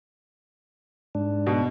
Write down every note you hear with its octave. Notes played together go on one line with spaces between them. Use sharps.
G#2 D4
B2